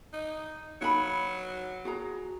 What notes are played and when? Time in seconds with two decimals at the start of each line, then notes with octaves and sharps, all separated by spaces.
0.13 D#4
0.81 F#3 D#4 F5 B5
1.85 F#4 G#4 A#5